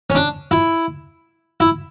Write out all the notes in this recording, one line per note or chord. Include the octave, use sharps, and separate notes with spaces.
C#4
D4
E4
E4